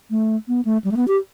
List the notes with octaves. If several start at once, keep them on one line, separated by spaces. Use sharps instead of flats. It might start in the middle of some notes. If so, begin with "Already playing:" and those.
A3
B3
A3
G3
A3
B3
G4